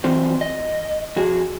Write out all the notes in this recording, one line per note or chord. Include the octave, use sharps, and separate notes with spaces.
E3 F#3 C4 F4 C5
D#5
F2 F#4 G#4